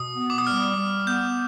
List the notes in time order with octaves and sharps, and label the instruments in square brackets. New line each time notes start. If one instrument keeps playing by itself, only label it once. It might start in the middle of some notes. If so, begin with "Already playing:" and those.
Already playing: [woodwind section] B2 [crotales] D#6
[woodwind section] B3
[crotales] D6
D#6
[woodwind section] G3 [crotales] F6
[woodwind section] G3
[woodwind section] B3 [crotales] G6